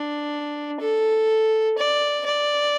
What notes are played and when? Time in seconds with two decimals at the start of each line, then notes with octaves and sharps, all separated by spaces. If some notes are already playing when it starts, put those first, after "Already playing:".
Already playing: D4
0.80 A4
1.78 D5
2.26 D5